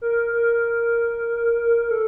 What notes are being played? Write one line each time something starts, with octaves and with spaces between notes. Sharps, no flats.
A#4
A#4
A4